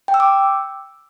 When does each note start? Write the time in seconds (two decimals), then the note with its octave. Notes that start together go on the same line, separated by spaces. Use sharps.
0.08 G5
0.14 E6
0.20 D6